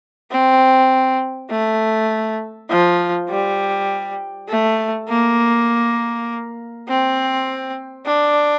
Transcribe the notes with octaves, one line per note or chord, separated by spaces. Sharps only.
C4
A3
F3
G3
A3
A#3
C4
D4